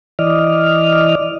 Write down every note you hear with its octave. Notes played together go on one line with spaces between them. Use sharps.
E3 D5 D#5 F6